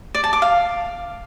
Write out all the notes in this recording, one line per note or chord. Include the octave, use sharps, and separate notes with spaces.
D5
A5
D6
F5